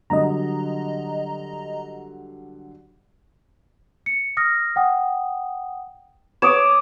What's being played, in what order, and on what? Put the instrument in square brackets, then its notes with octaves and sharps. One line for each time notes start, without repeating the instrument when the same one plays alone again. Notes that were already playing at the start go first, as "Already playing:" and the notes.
[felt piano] D3 F#3 G3 [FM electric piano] D#5 A#5
[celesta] C#7
D#6 F6 A#6
F#5 G5 D#6
[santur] C#5 D6 D#6 [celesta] D7 E7